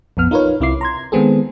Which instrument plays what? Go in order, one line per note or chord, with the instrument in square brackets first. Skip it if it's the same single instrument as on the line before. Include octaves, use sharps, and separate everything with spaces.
[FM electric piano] A#1 F2 B3 F6
D#4 F4 A#4 B4 C#5
C2 C3 E4 F4 D6 C7
A#5 C6 G#6
D#3 G#3 B3 C4 G#4 A4